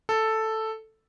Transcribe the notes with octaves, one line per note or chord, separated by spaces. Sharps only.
A4